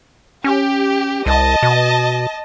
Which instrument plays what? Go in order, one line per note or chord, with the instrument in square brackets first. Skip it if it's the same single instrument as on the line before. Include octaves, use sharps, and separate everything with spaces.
[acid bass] C#4 [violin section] G4
[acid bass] C2 [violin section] D#5 A5
[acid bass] B2